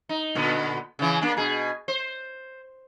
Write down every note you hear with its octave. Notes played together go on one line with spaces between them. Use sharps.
D#4
A#2 D3 B3
C#3 E3
A#3 D4
B2 G#4
C5